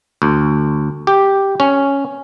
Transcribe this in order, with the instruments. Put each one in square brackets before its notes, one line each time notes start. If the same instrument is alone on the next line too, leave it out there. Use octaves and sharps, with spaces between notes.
[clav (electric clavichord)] D2
G4
C#4